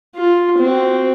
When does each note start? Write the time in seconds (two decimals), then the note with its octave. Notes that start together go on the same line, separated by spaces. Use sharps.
0.16 F4
0.59 C4 F#4